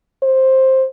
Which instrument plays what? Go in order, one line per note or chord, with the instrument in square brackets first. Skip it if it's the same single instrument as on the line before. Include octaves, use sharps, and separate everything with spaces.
[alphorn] C5